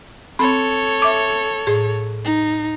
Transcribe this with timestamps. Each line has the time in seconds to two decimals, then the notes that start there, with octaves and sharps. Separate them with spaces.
0.39 C4 A4 C#5 B5
1.02 E5 D6
1.67 A2 G#4
2.25 D#4